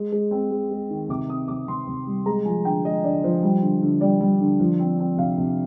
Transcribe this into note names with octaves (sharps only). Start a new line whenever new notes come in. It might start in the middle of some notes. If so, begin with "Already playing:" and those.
Already playing: G#3
G#3
C4
G#3
G#3
D#3
C3 D6
C4 D#6
C3 D6
C3 C6
C3
G3
G#3 A#5
F3 G#5
D3 G5
G#3 D#5
D3 D5
F3 C5
G3
D3
D3
G3 D5
G3
D3
F3
C4
C4
C3 F5
C3